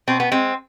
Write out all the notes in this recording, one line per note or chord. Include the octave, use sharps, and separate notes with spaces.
B2 C4
B3
G#3 C4